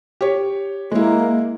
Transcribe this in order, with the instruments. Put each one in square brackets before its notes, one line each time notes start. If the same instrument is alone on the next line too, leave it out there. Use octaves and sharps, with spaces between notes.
[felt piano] G4 C#5
[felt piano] G#3 E4 [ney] A#3